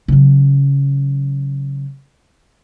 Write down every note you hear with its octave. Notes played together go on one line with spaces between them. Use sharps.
C#3 F#3